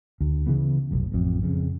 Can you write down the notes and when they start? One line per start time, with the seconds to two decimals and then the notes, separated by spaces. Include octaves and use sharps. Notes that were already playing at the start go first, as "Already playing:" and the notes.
0.21 D2
0.46 C#3 E3 B3
0.91 F1 B1
1.12 A1 F2
1.43 F2 C#3